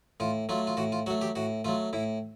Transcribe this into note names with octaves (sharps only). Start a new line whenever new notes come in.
A2 F4
F#3 A3 F4
F4
A2 F#4
F4
F#3 A3 F#4
G4
A2 F#4
F#3 A3 F4
A2 E4